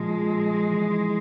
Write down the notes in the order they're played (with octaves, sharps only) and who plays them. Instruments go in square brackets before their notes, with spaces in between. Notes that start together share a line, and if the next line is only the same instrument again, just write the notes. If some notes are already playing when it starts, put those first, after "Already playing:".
Already playing: [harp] A#2 F3 [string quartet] G#3
[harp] C4
E3